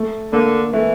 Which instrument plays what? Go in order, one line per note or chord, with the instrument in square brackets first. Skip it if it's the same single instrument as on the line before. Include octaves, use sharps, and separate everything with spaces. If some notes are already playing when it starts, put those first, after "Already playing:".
Already playing: [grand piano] A3
[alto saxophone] D3 [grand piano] A#3
[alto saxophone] E3 [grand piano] A3